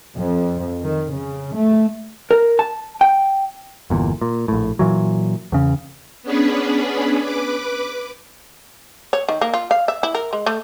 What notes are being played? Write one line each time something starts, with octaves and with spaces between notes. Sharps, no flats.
F2
D#3
C#3
A3
A#4
A5
G5
G1 E2 A#2
A#2
A#1 A2
A#2 E3 F#3
E2 C#3
B3 C#4 D4 G#4 B4
B4 D6
C#5
D#3
A#3
F4
F5
E5
E4
A#4
G#3
A3